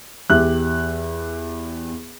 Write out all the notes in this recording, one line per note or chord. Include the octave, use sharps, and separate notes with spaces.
E2 G4 E5 F#6